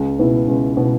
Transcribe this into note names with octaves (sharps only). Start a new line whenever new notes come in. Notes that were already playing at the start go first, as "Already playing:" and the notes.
Already playing: C#2
B2 B3 E4
C#2
B2 B3 E4